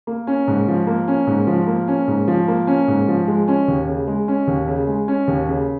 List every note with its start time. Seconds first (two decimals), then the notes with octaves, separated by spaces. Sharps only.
0.07 A#3
0.27 C#4
0.48 G#2
0.68 F3
0.87 A#3
1.08 C#4
1.27 G#2
1.47 F3
1.67 A#3
1.88 C#4
2.08 G#2
2.28 F3
2.48 A#3
2.67 C#4
2.88 G#2
3.08 F3
3.28 G#3
3.48 C#4
3.68 D#2
3.88 C#3
4.07 G#3
4.28 C#4
4.47 D#2
4.68 C#3
4.87 G#3
5.08 C#4
5.28 D#2
5.48 C#3